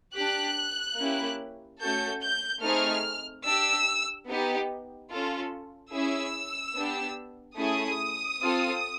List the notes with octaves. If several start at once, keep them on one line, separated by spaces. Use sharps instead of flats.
D4 G4 F#6
A#3 C#4 E4 G4
A3 C#4 F#4 A4 G6
G6
A3 C4 D#4 G#4 F6
D4 G4 E6
B3 D#4 G4
C#4 F4 A4
C#4 E4 G#4 E6
B3 D4 G4
A3 C#4 E4 G#4 D#6
C4 F4 A4